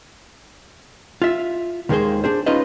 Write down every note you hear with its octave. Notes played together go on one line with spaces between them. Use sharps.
F4 E5
D#2 D#3 G#3 A#3 G#4 C5
D4 G#4 C5
C#4 D#4 F4 B4 C5 D#5